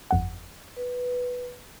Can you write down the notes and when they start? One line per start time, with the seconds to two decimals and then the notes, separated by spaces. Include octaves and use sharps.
0.11 G1 F2 F#5
0.77 B4